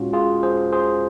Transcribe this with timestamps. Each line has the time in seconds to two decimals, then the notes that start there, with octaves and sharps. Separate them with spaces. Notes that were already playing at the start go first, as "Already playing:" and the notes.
Already playing: A#2 G#3 C#4 F4 F#4
0.13 F4 G#4
0.43 G#4 C5
0.72 G#4 C5